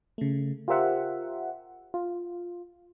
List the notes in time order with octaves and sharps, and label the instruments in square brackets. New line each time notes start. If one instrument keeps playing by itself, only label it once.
[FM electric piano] C#3 A3
F4 G4 A#4 C5 E5 F#5
F4